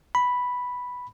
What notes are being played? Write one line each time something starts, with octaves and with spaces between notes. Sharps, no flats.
B5